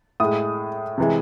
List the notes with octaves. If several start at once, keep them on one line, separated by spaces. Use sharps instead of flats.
A2 G#3 D#6
C3 E3 G#3